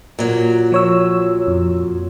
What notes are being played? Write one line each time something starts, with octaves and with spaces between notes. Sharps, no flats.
A#2 F#3
F3 C#5 E6
F2